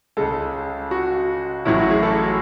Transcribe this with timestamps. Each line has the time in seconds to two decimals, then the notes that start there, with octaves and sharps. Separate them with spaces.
0.17 C#2 C#3 G#3 A4
0.91 F#4
1.65 A1 A2 F#3 E4
1.78 F#4
1.90 G#4
2.03 A4